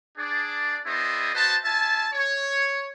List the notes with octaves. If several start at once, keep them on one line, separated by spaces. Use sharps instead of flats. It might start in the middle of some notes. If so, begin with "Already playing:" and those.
D4 G#4 D5
B3 E4 G#4 C5 D5 D#5
F#4 B4 C5 D#5 A5
F4 E5 G#5 A5
C#5